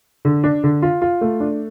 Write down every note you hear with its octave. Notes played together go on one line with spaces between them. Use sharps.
D3
D4
D3
F4
F4
A3
D4